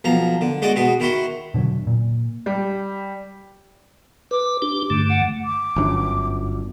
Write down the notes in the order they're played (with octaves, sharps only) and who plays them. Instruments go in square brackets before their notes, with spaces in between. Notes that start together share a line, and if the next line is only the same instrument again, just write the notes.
[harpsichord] B1 F3 A#5
D3
G#3 F#4 G#4 D5 D#5
B2 F#4 G#4
D#3 E4 F#4 C6
[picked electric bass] B2 D3 E3 F#3
A#2
[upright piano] G3
[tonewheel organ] B4 [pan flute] D6
[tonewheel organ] D4 G4
G2 D3 A3
[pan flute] F#5
[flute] D6
[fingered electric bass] G1 F#2 D4